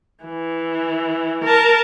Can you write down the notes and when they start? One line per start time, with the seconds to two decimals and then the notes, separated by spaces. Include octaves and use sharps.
0.25 E3
1.44 A#4 A5